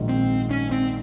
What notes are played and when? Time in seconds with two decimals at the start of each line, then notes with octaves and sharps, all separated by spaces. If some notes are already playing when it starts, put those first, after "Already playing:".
Already playing: A#1 G#2 D#3
0.09 C4
0.50 C#4
0.71 C4